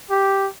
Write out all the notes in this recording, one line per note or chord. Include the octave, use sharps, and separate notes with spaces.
G4